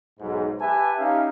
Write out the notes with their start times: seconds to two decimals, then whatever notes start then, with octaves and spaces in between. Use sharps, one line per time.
0.20 B1 G#2
0.60 G4 B4 E5 G#5 A5
0.98 C#4 D#4 G4 E5 F5